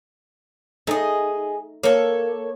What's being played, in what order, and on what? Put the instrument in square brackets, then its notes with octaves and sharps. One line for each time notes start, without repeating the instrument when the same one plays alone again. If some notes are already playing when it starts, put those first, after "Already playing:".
[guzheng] A3 D#4 [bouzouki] G#4 D#5
[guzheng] A#3 [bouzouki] A4 C#5